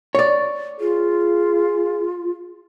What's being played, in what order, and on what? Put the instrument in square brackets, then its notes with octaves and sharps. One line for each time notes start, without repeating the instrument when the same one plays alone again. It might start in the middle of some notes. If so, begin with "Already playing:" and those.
[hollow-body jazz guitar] C#5 D5
[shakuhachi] F4 [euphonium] G#4